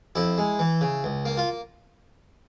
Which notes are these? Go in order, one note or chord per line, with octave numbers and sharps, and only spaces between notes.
F2 E4
G#3
E3
C#3
C#2
A#3
F4